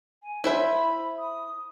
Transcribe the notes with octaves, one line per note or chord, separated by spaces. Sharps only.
G#5
E4 C5 E5 B5
D#6